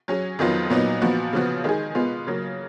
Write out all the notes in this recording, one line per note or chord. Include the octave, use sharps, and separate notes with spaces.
F#3 C#4 G#4
F2 D#3 F#3 B3 F4
A#2 F#3 B3 D#4
A#2 F3 B3 F#4
C#3 F3 B3 F#4
D#3 G#3 D#4 G#4
B2 G#3 B3 F4
C#3 F#3 A#3